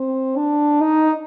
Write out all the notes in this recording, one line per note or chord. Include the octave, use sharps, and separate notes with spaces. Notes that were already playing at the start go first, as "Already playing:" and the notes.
Already playing: C4
D4
D#4